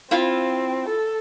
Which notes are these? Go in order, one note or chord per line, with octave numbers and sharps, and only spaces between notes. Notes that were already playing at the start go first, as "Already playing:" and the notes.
C4 E4 F4 F5
A4